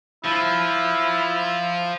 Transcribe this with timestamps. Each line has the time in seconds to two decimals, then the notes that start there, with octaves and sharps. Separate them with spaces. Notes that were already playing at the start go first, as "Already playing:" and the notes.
0.25 F3 E4